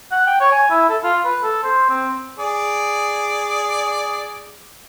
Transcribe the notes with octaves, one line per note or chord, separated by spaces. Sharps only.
F#5
G5
C#5
G#5
E4
A4
F4
B4
A4
C5
C4
G#4 D5